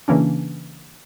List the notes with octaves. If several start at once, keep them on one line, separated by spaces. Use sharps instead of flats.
C#3 E3 A#3 C#4 D4